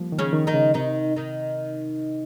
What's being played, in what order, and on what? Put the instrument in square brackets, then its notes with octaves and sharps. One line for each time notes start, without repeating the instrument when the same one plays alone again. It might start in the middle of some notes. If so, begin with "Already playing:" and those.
Already playing: [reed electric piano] F3 G3 A#3
D#3
[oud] C#3 C#4
[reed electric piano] D#3
[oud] D#3 D#4
[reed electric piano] C#3
[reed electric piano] C3 [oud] D#3 D#4
[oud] D#3 D#4